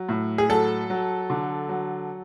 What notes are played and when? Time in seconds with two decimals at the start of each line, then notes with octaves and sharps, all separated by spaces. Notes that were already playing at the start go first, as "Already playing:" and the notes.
Already playing: F#3
0.09 A2
0.38 G#4
0.49 F#3 A4
0.90 F#3
1.30 D3
1.69 F#3